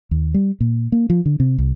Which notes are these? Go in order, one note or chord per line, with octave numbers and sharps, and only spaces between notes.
D#2
G3
A#2
A#3
F3
D3
C3
C2